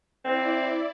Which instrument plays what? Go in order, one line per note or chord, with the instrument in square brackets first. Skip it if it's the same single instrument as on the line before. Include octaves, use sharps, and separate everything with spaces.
[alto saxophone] C4 [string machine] E4 D5